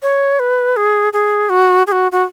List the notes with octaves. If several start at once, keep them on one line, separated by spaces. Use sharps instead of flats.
C#5
B4
G#4
G#4
F#4
G#4
F#4
F#4